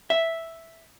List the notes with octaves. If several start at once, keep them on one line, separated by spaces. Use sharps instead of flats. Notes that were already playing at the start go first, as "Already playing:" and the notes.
E5